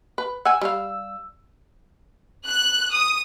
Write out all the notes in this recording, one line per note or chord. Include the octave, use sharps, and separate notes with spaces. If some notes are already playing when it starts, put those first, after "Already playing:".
B4
F#5 G#5 E6
G3 F5
F#6
D#6